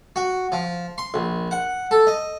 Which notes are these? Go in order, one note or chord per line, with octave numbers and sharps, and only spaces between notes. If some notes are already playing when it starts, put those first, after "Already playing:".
F#4
F3
C6
A#1
F#5
A4
D#5